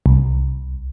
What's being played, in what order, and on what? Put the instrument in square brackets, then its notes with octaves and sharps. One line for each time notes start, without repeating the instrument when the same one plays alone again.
[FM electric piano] C2